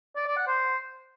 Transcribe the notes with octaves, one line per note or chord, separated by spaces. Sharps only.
D5
D5
F#5
C5